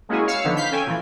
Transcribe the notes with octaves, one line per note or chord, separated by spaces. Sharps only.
G#3 A#3 C#4 E4 F#4 G#4
C#5 F5 E6 C#7
D3 D#3 F3 B3
F5 G6 B6
C#4 A4 G5 G#5
A#2 E3